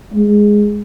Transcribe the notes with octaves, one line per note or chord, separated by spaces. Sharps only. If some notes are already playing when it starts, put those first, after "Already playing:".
G#3